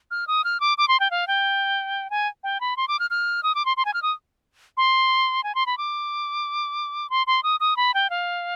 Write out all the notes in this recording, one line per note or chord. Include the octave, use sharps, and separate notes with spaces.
F6
D#6
F6
D6
D6
C6
G5
F5
G5
G#5
G5
B5
C6
D6
F6
F6
D#6
D6
C6
C6
G#5
F6
D#6
C6
G#5
C6
B5
D6
C6
C6
D#6
D#6
B5
G5
F5